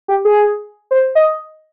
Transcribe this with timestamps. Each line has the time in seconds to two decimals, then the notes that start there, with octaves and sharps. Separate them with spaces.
0.08 G4
0.25 G#4
0.91 C5
1.15 D#5